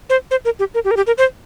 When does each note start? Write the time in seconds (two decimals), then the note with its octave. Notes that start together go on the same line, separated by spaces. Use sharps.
0.10 C5
0.31 C5
0.45 A#4
0.59 G4
0.74 A#4
0.85 G4
0.91 A#4
0.97 G4
1.07 A#4
1.18 C5